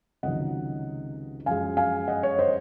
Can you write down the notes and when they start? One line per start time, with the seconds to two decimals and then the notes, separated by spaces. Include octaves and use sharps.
0.23 C#2 C3 D#3 F#3 D#5 F#5
1.46 F#2 F3 G#3 F5 G#5
1.77 F5 G#5
2.08 D#5 F#5
2.23 C#5
2.39 C5 D#5